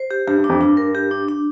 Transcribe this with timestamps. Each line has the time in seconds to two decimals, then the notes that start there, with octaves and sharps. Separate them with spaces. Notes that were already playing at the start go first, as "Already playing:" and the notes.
Already playing: C5
0.11 G4
0.27 G2 G4
0.38 G2
0.44 D4
0.49 F2
0.60 G2 D4
0.77 A#4
0.95 G4
1.11 D4
1.28 D4